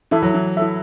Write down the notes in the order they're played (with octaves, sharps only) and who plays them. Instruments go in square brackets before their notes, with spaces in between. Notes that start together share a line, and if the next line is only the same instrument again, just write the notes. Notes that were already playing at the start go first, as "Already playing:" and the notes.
[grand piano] E3 [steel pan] E4 A4 E5
[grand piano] F#3
E3
[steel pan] E4 A4 E5